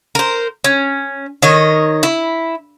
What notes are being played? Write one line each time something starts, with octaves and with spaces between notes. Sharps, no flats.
A#4 C5
C#4
D#3 C#5 D#5
E4